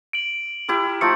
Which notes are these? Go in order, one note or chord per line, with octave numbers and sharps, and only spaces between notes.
D7 F#7
E4 G4 A#4
F3 A3 D#4 C#7